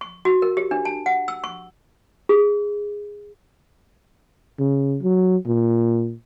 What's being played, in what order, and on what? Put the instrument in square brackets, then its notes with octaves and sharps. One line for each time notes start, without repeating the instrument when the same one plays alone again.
[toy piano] C#6
F#4
A#4
G4
D4
A5
F#5
E6
C#6
G#4
[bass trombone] C#3
F#3
A#2